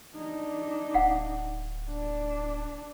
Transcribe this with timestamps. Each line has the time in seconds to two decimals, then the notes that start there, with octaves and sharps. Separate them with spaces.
0.16 D4 D#4
0.94 D1 F5 F#5
1.90 D4